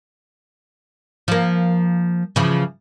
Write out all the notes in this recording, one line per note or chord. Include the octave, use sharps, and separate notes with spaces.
F3 A#3
C#3 E3 F3